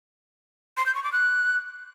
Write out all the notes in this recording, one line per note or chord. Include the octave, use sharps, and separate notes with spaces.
C6
G6
C#6
D6
F#6